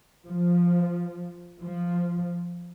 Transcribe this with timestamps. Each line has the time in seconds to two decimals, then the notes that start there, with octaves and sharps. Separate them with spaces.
0.27 F3
1.61 F3